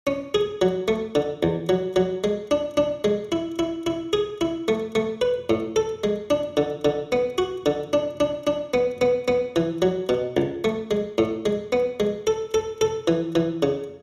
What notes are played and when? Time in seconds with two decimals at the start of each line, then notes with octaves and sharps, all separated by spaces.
0.07 C#4
0.34 G#4
0.62 F#3
0.88 A3
1.15 D3
1.43 E2
1.69 F#3
1.96 F#3
2.24 G#3
2.51 D4
2.77 D4
3.04 G#3
3.32 E4
3.59 E4
3.86 E4
4.13 G#4
4.41 E4
4.68 A3
4.95 A3
5.21 B4
5.50 A2
5.76 A4
6.04 G#3
6.30 D4
6.57 D3
6.85 D3
7.12 B3
7.38 F#4
7.66 D3
7.93 D4
8.20 D4
8.47 D4
8.74 B3
9.01 B3
9.28 B3
9.56 E3
9.82 F#3
10.09 B2
10.37 C#2
10.64 A3
10.91 G#3
11.18 A2
11.46 G#3
11.72 B3
12.00 G#3
12.27 A4
12.54 A4
12.81 A4
13.08 E3
13.35 E3
13.63 C#3